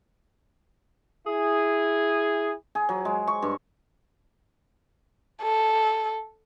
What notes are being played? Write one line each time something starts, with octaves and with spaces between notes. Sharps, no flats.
E4 G#4
G#4
F#3
G#3
C#6
G2
A4